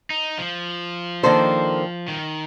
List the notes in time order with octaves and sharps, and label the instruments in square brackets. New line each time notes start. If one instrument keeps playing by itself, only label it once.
[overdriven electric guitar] D#4
F3
[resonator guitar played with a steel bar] D#3 A#3 D4 A4 C5
[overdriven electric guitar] D#3